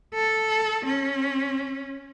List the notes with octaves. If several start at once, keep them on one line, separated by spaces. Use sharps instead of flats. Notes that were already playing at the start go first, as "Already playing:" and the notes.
A4
C#4